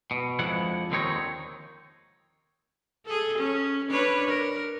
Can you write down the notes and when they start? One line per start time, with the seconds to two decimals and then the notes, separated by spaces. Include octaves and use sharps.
0.11 B2
0.39 F2 F3 G#3 D4 E4 F#5
0.91 D#2 D3 D#3 C4 D#4 C#5
3.05 G#4 A4
3.38 C#4
3.90 D4 B4 C#5
4.28 A#4